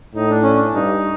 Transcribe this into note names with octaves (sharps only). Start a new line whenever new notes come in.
A2 D#4
D4
C#4
D4
G2 D#4